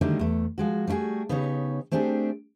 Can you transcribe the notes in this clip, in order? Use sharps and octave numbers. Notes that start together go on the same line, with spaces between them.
D3 D#3 F#3 G3 A3 D#4
E2 A3
F3 G#3 F#4
G3 A3 E4 F#4 G#4
C#3 B3 D#4 G4 C#5
A3 C4 D4 G4 G#4